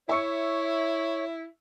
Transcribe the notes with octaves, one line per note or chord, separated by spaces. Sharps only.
E4 C#5 E5 C#6 C#7